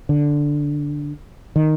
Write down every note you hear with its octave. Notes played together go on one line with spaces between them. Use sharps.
D3
D#3